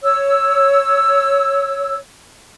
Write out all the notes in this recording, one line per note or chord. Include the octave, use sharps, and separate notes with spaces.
C#5 E6